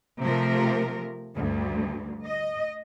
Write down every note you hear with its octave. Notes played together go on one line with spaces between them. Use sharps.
C3 F3 A3 A#4
D2 G2
D#5